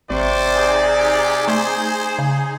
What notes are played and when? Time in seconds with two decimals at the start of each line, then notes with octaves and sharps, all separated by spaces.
0.10 G#1 C3 C5 D5 C#6
0.54 D#4 G#4
1.00 G4
1.48 A3 C5
2.19 C#3